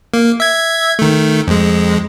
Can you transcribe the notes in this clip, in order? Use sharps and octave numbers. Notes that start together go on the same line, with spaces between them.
A#3
E5 G#6
D#3 A3
F2 G#3